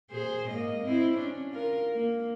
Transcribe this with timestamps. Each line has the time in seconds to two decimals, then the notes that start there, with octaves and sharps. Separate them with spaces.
0.11 A#2 G#4 C5
0.48 G#2 A#3 D#5
0.84 C4 E4 C5
1.18 C#4 D4
1.52 F4 A#4
1.94 A#3